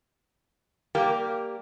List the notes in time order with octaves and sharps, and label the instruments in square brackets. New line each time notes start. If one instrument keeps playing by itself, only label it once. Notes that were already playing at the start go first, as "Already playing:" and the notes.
[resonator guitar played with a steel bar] G3 A#3 G4 A#4